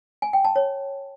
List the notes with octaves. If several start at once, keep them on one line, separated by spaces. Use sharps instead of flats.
G#5
G5
A5
C#5